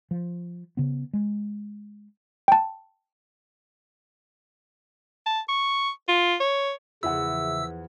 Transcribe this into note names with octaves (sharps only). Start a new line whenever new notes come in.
F3
C#3 B3
G#3
G5 A5
A5
C#6
F4
C#5
E2 C#3 F3 E4 E5 F#5 E6